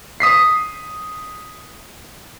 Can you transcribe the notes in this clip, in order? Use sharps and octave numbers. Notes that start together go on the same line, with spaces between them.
D#6 B6 C7